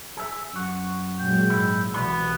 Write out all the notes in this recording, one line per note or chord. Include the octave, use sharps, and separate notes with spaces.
G#4 E5
F#2 F#4
A#2 F#3 G#3 G5
G#2 E4
C2 B2 E3 B3 F#4 D5 B5